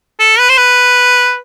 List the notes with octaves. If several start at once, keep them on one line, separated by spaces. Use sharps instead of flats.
A4
B4
C5
B4